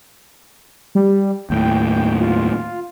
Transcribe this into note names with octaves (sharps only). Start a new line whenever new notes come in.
G3
D#2 A2 G5
F4